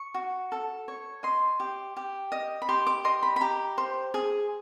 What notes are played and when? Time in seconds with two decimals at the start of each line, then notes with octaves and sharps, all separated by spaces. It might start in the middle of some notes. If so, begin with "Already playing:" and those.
Already playing: C#6
0.14 F#4
0.52 A4
0.88 C#5
1.23 D#5 C6
1.60 G4
1.96 G4
2.32 D#5
2.62 B5
2.69 G4 C6
2.87 D6
3.05 D#5 C6
3.23 B5
3.36 B5
3.41 G4 A#5
3.78 C5
4.14 G#4